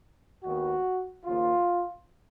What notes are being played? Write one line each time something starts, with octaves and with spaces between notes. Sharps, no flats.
D#2 D#3 G#3 B3 F#4
D#2 C#3 F3 A#3 F4